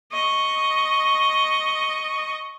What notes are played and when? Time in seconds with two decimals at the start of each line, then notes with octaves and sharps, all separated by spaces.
0.12 D#5 C#6